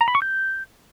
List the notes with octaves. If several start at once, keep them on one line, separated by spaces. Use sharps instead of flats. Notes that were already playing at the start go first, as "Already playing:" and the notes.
A#5
B5
C#6
G6